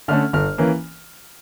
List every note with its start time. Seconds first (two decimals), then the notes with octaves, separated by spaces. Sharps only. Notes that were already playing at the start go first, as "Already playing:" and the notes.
0.08 D3 A3 C#4 F6
0.33 G1 F6
0.58 E3 A#3 C#4